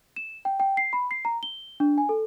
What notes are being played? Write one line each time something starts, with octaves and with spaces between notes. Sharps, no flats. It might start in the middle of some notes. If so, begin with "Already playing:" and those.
E7
G5
G5
C7
B5
C7
A#5
G7
D4
G#5
A4